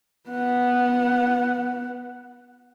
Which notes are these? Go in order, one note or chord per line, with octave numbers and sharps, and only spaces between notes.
B3 F#5